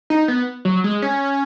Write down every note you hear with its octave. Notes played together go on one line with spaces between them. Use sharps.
D#4
B3
F#3
G#3
C#4